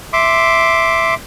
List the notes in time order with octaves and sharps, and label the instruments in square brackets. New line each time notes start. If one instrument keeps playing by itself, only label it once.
[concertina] E5 C6 D6